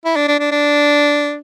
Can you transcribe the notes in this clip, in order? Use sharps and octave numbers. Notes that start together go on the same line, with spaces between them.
E4
D4
D4
D4
D4